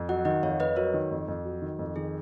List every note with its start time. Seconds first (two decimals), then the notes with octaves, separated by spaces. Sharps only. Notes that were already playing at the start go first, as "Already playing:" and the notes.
Already playing: F2
0.09 F#3 D#5 F#5
0.25 D#3 D#5 F#5
0.43 F2 C#5 F5
0.60 F2 B4 D#5
0.76 F#3 A#4 C#5
0.94 D#3
1.11 F2
1.28 F2
1.45 F#3
1.62 D#3
1.79 F2
1.96 D#3 G#4